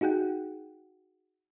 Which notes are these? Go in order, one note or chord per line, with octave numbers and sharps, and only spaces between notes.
D#4 F#4 G#4 F#5 G5